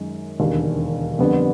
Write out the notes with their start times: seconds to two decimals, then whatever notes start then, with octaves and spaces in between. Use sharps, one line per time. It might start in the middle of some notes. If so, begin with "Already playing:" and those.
Already playing: F#2 D#3 G#3
0.40 E1 D#2 D3
1.19 F2 D3 G3 B3